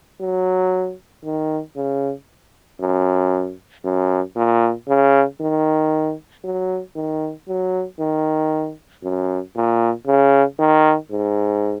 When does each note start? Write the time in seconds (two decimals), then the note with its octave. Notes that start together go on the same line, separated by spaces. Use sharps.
0.21 F#3
1.24 D#3
1.76 C#3
2.81 F#2
3.84 F#2
4.36 A#2
4.88 C#3
5.41 D#3
6.44 F#3
6.96 D#3
7.48 F#3
7.99 D#3
9.03 F#2
9.56 A#2
10.07 C#3
10.59 D#3
11.11 G#2